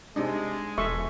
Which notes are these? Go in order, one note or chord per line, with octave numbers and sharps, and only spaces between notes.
C3 G#3 D4 D#4
E1 A4 E5 C6 C#6